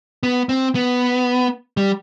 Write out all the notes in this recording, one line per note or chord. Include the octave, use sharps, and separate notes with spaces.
B3
C4
B3
G3